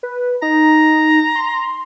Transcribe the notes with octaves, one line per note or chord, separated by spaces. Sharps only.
B4
D#4 A#5
C6